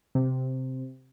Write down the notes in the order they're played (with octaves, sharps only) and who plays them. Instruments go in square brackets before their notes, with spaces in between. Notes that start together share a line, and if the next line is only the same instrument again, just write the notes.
[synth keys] C3